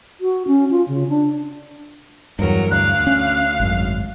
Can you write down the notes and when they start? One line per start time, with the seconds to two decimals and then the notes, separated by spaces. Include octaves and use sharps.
0.21 F#4
0.47 C#4
0.71 F4
0.88 C#3
1.09 D4
2.39 E2 G2 F#3 A#4
2.71 D2 F5 F#6
3.07 C#4
3.60 G#1 F#2